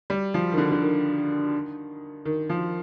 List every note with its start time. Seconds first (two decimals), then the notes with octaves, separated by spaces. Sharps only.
0.10 G3
0.34 F3
0.52 D#3
0.58 D3
0.72 D3
0.82 D#3
2.25 D#3
2.49 F3